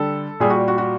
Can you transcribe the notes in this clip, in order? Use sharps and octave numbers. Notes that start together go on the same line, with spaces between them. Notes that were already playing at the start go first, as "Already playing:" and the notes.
Already playing: D3 G3 A4
A#2 G3 G#4
F#4
F#4
F#4